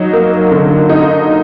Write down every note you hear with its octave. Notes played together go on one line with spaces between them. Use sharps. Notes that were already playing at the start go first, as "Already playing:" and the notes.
Already playing: F#3 D#4
A#3
D3
D#4